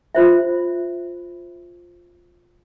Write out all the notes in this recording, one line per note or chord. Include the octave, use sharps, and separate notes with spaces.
F4 C5 E5